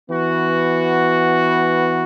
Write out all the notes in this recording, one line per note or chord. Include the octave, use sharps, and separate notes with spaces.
E3 B3 F#4